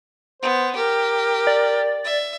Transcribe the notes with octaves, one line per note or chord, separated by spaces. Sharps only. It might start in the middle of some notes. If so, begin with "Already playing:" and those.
B3 C5
G4 A#4
D5
E5